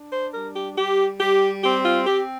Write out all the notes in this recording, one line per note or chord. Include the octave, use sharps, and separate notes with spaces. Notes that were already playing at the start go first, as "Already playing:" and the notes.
Already playing: D4
C5
G3 A#4
G4
G3 G4
G3 G4
C4 G4
F4
C4 G4